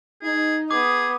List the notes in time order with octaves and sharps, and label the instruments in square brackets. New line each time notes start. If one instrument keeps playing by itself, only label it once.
[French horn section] D#4 [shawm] G#4
[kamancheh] B3 D#6 [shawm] G#4 [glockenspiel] D6